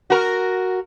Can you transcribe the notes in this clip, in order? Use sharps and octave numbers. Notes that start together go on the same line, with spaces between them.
F#4 A#4